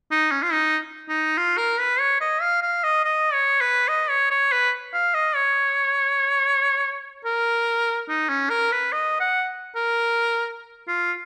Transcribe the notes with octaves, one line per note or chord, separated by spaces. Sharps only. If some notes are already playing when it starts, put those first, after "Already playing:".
D#4
C#4
F4
D#4
D#4
F4
A#4
B4
C#5
D#5
F5
F5
D#5
D#5
C#5
B4
D#5
C#5
C#5
B4
F5
D#5
C#5
A#4
D#4
C#4
A#4
B4
D#5
F#5
A#4
F4